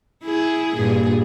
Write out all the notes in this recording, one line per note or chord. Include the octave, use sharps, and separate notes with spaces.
E4 G#4
G2 A#2 G#4